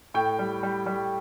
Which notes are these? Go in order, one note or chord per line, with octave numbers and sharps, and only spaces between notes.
A2 G5
G3
G3
G3